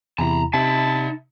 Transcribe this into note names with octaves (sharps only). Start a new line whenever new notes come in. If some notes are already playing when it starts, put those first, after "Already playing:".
E2 C3 E4 A5 A#5
C3 D#4 E5 A5